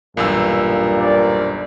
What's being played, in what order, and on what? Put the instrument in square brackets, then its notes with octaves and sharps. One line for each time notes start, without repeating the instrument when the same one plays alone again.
[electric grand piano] B1 E2 E6 [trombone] G2 [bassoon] A#2
[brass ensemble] A#4 C5 D5